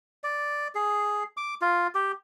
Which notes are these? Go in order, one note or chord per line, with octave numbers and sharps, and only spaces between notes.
D5
G#4
D6
F4
G4